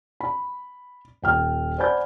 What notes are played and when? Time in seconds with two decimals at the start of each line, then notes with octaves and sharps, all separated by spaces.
0.20 B5
1.22 D#1 G5 F6
1.78 C5 D5 F#5 G#5 B5 G6